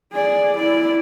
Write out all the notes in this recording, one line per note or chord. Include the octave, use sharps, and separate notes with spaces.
G#4 D5
E4 D5